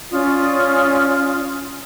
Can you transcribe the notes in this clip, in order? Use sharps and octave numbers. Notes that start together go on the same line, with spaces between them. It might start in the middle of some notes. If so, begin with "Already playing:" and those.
C#4 F4 D5 D#6